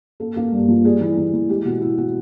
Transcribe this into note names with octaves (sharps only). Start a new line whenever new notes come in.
A#3 A4
A#3
G2
F3
G3 G#4
E3
E3
E3
G#3 G4
B2 F#4
B2 E4
B2 F#4